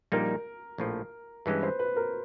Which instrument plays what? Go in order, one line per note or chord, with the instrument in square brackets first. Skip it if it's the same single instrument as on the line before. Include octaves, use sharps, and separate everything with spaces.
[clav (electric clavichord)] A#1 A#2 G3 A#3 D#4 [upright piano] A#4
[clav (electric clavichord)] A#1 A2 F3
[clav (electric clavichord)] G2 E3 G#3 C#4 [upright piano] B4
[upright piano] C5
B4
A#4